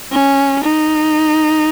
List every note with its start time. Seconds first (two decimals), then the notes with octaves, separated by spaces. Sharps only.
0.12 C#4
0.63 D#4